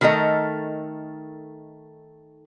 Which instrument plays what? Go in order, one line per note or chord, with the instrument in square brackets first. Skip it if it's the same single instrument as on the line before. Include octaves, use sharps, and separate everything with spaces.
[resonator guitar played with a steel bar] D#3 A3 A4 A#4 D#5